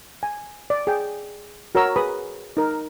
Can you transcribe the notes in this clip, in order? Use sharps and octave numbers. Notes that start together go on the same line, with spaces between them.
G#5
D5
G#4 G5
F#4 A#4 C#5 A#5 E6
G#4 B4 B5 D#6
D#4 A#4